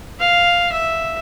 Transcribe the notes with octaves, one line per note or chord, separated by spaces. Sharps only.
F5
E5